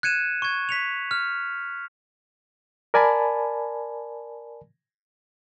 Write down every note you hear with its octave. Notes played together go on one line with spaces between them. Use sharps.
F#6 G#6 C#7 D#7 E7
C#6 G#6
B6 C#7 F7
F6
A#4 D5 G#5 A5 B5